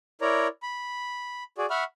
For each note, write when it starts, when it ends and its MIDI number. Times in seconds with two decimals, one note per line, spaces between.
0.21 0.47 64
0.21 0.47 70
0.21 0.47 73
0.21 0.47 74
0.21 0.47 82
0.63 1.43 83
1.58 1.66 66
1.58 1.66 68
1.58 1.66 74
1.70 1.84 76
1.70 1.84 78
1.70 1.84 83
1.70 1.84 85
1.70 1.84 89